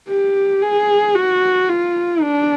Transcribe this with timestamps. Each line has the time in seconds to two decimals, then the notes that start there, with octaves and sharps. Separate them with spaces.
0.09 G4
0.61 G#4
1.15 F#4
1.69 F4
2.22 D4